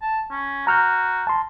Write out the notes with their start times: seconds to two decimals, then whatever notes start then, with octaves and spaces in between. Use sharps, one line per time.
0.02 A5
0.31 C#4
0.67 F#4 A#5 F6 G6
1.27 A5 C6